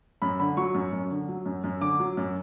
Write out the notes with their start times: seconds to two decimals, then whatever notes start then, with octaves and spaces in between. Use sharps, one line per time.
0.22 F#2 B5
0.40 D3 B5
0.57 F#3 C#6
0.74 F#2
0.92 F#2
1.11 D3
1.28 F#3
1.46 F#2
1.64 F#2
1.81 D3 D6
2.00 F#3
2.17 F#2